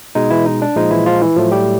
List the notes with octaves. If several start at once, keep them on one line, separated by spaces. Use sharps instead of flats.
B2 G#3 D#4
E3 E4
D#4
D4
A#2 F3 G#3 D#4
E3 E4
F3 F4
E3 E4
A2 F3 F#3 A3 F4
G3 G4